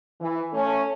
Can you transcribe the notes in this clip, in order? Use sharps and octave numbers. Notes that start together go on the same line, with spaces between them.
E3
A3 C#4